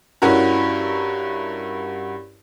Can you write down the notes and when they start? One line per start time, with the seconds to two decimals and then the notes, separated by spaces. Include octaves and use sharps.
0.22 G2 C#4 E4 F#4 A#4